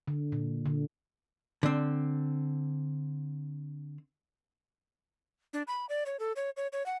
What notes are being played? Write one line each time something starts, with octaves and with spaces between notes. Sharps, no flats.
D3
A#2
D3
D3 C4
D4
B5
D5
C#5
A4
C#5
C#5
C#5
F#5